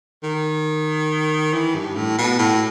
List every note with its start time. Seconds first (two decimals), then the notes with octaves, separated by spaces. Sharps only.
0.23 D#3
1.53 E3
1.75 G2
1.95 A2
2.18 B2
2.38 A2